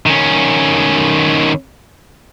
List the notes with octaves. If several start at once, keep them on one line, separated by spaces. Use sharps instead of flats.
D#3 C#4